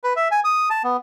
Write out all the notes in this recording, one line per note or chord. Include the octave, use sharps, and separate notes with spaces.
B4
E5
G#5
D#6
A5
B3